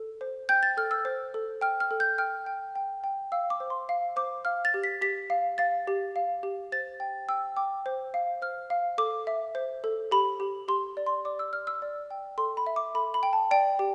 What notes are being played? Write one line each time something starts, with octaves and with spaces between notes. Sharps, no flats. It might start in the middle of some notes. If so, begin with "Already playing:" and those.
Already playing: A4
C5
G5 G6
A6
A4 F6
E6
C5
A4
G5 F6
F6
A4
G6
G5 F6
G5
G5
G5
F5 E6
D6
C5
C6
F5
C5 D6
F5 F6
A6
G4
B6
G4 B6
F5
F5 A6
G4
F5
G4
C5 A6
G5
G5 E6
G5 D6
C5
F5
C5 F6
F5
A4 D6
E5
C5
A4
G4 B5
G4
G4 C6
D5
C6
D5 D6
E6
D5 F6
E6
D5
G5
A4 C6
B5
E5
D6
A4 B5
B5
G5
A5
D5 G5
G4